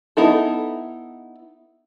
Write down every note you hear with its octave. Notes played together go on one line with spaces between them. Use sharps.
B3 D#4 E4 A4